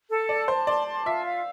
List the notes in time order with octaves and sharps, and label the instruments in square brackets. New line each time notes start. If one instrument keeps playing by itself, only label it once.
[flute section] A4
[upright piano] D5 [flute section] A5
[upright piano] C5 [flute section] A5
[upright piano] D5 [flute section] C6
[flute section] A5
[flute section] F4 [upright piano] E5
[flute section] F5